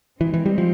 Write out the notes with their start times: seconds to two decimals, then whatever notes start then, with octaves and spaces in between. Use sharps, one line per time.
0.21 D#3 E3 G#3 C4 D#4
0.34 E3
0.46 G3
0.58 F3